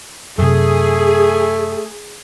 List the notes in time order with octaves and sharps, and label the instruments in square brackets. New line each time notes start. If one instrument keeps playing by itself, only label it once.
[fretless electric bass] F#2 C3 [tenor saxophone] A3 [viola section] G#4